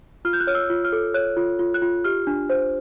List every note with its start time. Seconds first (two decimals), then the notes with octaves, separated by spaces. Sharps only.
0.25 F4 F6
0.33 G6
0.40 F#6
0.47 C#5 F6
0.55 E6
0.70 F4
0.85 F6
0.92 A4
1.14 C#5 F#6
1.37 F4
1.59 F4
1.74 F#6
1.82 F4
2.04 G4 F6
2.27 D4
2.50 C5